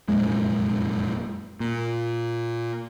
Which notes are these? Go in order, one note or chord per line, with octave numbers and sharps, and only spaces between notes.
F1 F#2 A#2 G#3
A#2